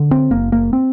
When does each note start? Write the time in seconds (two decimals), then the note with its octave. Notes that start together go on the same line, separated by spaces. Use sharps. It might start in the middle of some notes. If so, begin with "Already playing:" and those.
Already playing: D3
0.11 C4
0.31 F#1 A#3
0.52 A#3
0.73 C4